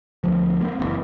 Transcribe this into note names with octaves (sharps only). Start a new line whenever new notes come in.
D2 F3
A#3 C4
F#1 B2 E3